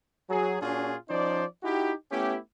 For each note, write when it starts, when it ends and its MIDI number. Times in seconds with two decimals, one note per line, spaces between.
0.30 0.57 54
0.30 0.57 68
0.61 0.94 46
0.61 0.94 61
0.61 0.94 62
0.61 0.94 65
0.61 0.94 66
0.61 0.94 68
1.09 1.44 53
1.09 1.44 61
1.09 1.44 63
1.09 1.44 72
1.09 1.44 74
1.63 1.93 63
1.63 1.93 64
1.63 1.93 66
1.63 1.93 67
2.11 2.37 57
2.11 2.37 59
2.11 2.37 61
2.11 2.37 64
2.11 2.37 67